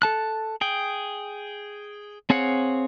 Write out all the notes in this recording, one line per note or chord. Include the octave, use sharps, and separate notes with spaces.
A4 A5 F#6
G#4 G5
C4 G#4 C#5 F5 F#5